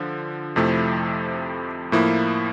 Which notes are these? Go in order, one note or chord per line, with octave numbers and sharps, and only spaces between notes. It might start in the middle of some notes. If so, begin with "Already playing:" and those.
Already playing: D3 F3
F2 C3 F3 A3 E4
A2 F3 A#3 E4